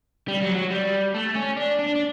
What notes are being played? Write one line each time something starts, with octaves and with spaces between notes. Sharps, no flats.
G3
F#3
F#3
G3
A3
C#4
D4
D4
D4